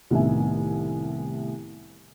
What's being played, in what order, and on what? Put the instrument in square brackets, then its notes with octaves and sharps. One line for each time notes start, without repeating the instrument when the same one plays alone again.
[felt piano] C2 A2 D#3 B3 E5 G#5